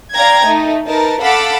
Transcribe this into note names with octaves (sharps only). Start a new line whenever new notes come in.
D5 F5 G5 A#5 G#6
A3 D#4
D#4 A#4 B4 A5
A4 F5 F#5 B5 D6 E6